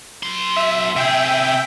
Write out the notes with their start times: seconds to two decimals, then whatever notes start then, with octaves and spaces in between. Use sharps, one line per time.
0.23 F#3 C6
0.56 E5
0.96 C3 G#4 E5 G5